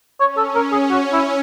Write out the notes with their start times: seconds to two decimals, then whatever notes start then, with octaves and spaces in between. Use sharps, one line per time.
0.20 C#4 C#5
0.37 A4
0.55 A#4
0.72 G#4
0.90 F#4
1.13 E4